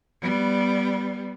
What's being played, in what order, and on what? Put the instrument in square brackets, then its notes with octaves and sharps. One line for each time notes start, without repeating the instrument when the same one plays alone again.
[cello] G3 B3